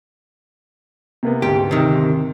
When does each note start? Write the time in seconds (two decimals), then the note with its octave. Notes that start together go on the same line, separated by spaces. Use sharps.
1.23 C3 A#3 B3
1.42 D2 G#2 G4
1.71 C3 D#3